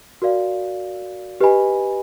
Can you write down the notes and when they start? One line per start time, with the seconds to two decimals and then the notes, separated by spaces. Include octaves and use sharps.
0.22 F#4 A#4 D5 F5
1.41 G4 B4 D#5 G#5 B5